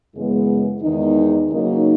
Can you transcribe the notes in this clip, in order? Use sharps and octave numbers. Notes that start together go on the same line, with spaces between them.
F#2 C#3 E3 G#3 B3
E2 D#3 G#3 D#4
C#3 F#3 A#3 D#4